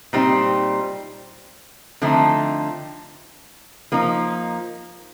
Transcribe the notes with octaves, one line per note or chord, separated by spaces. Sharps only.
A#2 G3 C4 D#4
D3 F3 A3 C4 D#4
F3 A#3 D#4